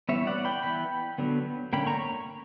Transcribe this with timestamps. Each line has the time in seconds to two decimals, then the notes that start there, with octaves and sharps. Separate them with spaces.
0.09 E3 G3 B3 C#5 E5
0.27 D5 F#5
0.45 G5 B5
0.63 E3 B3 G5 B5
1.18 D3 F#3 B3
1.73 D3 A#3 C#4 G5 B5
1.86 A#5 C#6